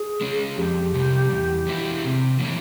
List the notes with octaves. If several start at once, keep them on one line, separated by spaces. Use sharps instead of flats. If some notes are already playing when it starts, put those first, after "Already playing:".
Already playing: G#4
G#3 C#4
F2 G4
C3 G3
E2
E3 G#3 E4
C3
E3 A#3 C#4